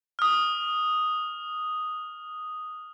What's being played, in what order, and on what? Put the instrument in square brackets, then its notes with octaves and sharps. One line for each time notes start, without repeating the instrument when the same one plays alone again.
[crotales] D#6 F6